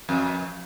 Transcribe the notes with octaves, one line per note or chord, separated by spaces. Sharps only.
F2